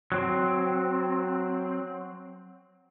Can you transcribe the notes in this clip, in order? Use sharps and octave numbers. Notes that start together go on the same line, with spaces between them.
F#3 C4